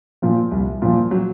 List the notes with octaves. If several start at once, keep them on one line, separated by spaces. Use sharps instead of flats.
A#2 F3
C2
A#2 F3
F#3